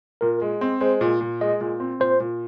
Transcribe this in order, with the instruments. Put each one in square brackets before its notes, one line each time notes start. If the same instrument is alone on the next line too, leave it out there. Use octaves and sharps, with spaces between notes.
[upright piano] A#2 [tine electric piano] A#4
[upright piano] G#3
C4
[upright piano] G#3 [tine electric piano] C5
[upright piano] A#2
A#2
[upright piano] G#3 [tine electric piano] D#5
[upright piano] A#2
C4
[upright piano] A#2 [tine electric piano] C5
[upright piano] A#2